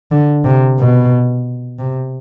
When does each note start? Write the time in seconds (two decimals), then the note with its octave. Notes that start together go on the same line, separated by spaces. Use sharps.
0.12 D3
0.44 C3
0.79 B2
1.79 C3